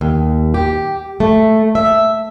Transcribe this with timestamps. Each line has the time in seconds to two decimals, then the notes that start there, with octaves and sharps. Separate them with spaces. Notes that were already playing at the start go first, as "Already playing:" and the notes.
0.01 D#2
0.54 G4
1.20 A3
1.75 E5